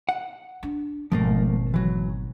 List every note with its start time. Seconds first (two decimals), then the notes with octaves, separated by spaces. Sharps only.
0.09 F#5
0.63 D4
1.12 G#1 B2 F3 A3 A#3
1.74 E3 F#3